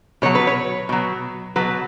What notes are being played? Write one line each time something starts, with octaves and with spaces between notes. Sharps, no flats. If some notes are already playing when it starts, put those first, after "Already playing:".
B2 F#3 C#5
B4
C#5
B2 F#3
B2 F#3 B4